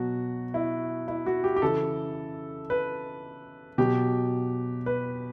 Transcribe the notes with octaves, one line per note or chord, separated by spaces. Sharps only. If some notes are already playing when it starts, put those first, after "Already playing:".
Already playing: B2 F#3 F#4
E4
E4
F#4
G4
G4
C#3 E3 A4
B4
B2 F#3 G4
B4